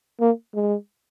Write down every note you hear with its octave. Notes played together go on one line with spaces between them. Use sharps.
A#3
G#3